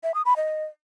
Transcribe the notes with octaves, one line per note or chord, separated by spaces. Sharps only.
E5
D#6
B5
D#5